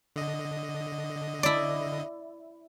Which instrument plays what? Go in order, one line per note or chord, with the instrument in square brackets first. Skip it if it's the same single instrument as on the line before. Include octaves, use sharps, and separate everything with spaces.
[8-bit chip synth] D3 D#5
[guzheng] E4 D5